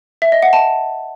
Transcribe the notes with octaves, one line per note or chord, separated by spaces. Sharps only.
E5
D#5
F#5
A5